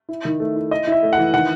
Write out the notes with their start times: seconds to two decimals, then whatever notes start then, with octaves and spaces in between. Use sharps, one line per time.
0.09 E4
0.25 D#3
0.40 A3
0.56 E4
0.71 E4 D#5
0.87 E4 E5
1.03 A3
1.13 F#5
1.18 E3
1.34 D#3 F#5